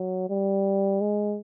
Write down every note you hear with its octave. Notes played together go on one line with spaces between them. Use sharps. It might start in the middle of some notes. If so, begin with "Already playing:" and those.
Already playing: F#3
G3
G#3